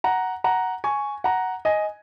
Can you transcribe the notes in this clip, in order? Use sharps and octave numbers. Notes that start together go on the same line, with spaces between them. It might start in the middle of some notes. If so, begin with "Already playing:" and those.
F#5 A#5
F#5 A#5
G#5 C#6
F#5 A#5
D#5 G#5